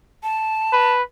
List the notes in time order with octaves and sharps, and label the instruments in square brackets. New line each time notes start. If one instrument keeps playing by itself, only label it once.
[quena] A5
[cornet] B4